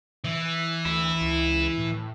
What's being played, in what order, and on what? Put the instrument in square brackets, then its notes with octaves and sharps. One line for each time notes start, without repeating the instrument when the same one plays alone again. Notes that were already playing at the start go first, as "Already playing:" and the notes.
[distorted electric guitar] E3
[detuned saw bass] D2 [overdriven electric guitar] E4
[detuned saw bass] C#2
A2